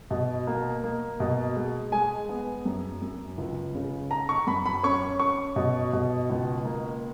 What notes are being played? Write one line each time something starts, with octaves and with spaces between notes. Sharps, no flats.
B2
A#3
A#3
B2
G#3
G#3 G#5
B3
F#2
F#2
C#2
C#3
D#4 A#5
C#6
F#2 B5
B5
C#4 C#6
C#4 C#6
B2
B2
C#2
A#3